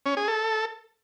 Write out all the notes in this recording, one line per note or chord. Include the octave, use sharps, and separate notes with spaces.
C#4
G#4
A4